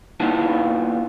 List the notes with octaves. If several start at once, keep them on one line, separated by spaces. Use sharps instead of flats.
A#2 B3 D#4 E4 A5